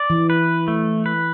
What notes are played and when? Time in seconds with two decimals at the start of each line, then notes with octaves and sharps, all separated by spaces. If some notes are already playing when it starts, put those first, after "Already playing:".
Already playing: D5
0.10 E3
0.30 B4
0.68 A3
1.06 B4